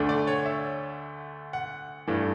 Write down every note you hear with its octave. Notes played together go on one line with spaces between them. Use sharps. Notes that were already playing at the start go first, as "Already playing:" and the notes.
Already playing: D2 D3 A3 D4
D5
C#5
E5
F#5
G2 E3 A3 D4